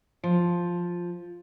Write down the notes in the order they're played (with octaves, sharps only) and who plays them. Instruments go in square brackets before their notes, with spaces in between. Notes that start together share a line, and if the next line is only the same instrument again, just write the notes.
[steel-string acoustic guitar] F3